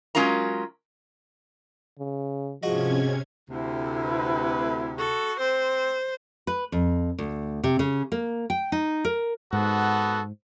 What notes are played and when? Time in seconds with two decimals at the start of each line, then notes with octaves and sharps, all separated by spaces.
0.15 F#3 G#3 C#4 F4 A#4 A#5
1.99 C#3
2.63 G#2 C3 F3 C#4 F#4 D#5 G#6
3.50 D2 C3 E4
4.05 B4
4.99 F#4 A4
5.40 C4 C5
6.47 B4
6.72 F2
7.19 D2
7.63 C3
7.79 C#3
8.12 A#3
8.50 G5
8.72 D#4
9.05 A#4
9.53 G#2 B3 F#4 A4